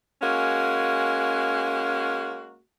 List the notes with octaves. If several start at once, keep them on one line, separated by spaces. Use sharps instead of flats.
G#3 A#3 C#4 F#4